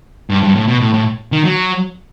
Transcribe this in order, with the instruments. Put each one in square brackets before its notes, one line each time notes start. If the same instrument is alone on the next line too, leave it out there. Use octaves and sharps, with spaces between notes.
[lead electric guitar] G2
G2
A2
B2
A2
A2
D#3
F#3